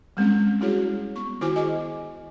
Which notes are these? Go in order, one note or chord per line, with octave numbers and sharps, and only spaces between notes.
G3 G#3 C4 C#4
G3 E4 F#4 G#4 C#5
B3 C#6
D#3 E4 F#4 C5 G#5 D6
G#4 D#5 G#5 D6